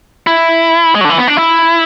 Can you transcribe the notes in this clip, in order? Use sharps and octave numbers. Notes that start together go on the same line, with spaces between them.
E4
G#3
F#3
D3
E3
B3
D4
E4